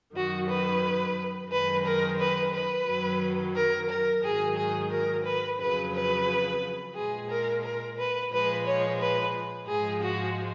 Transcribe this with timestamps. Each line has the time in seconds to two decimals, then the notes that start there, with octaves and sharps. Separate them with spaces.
0.14 F#2 D#3 F#3 F#4
0.48 B4
1.50 F#2 D#3 G#3 B4
1.84 A#4
2.18 B4
2.53 B4
2.86 F#2 D#3 F#3
3.55 A#4
3.89 A#4
4.23 G#2 D#3 F#3 G#4
4.56 G#4
4.91 A#4
5.25 B4
5.59 F2 C#3 F#3 B4
5.93 B4
6.95 A#2 G#3 G#4
7.29 A#4
7.63 A#4
7.97 B4
8.31 A#2 F3 G#3 B4
8.65 C#5
8.99 B4
9.67 G#2 F3 G#3 G#4
10.01 F#4